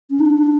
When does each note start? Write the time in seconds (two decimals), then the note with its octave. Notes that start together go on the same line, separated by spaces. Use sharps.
0.11 C#4
0.20 D#4
0.26 D4